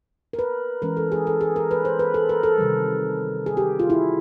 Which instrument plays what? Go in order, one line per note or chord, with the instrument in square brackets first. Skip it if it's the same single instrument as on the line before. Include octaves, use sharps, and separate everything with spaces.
[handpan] A#4
B4
E3 G#3 C#4 A#4
A4
G#4
A4
G#4
A#4
B4
C5
B4
A4
A#4
A4
C3 D#3 G3
G#4
G4
F4
E4